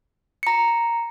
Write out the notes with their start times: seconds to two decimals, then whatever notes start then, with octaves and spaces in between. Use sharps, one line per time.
0.43 A#5 C#7